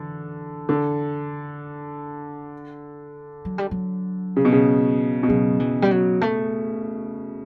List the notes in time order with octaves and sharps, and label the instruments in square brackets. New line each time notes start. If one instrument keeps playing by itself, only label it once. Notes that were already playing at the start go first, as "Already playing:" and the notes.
Already playing: [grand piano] D3 [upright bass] E3
[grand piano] D3
[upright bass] F#3
G3
F#3
[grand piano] C#3
B2
C#3
B2
[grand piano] C#3 [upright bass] F#3
[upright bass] E3
G3
F#3
A3